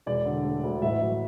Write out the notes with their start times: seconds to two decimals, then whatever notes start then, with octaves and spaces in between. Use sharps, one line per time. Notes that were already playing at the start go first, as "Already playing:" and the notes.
0.06 E1 D5
0.26 D3
0.45 A3
0.63 D2
0.82 A1 E5
1.01 F#3